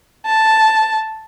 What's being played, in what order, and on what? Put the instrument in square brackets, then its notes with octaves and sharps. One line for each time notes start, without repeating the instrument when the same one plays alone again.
[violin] A5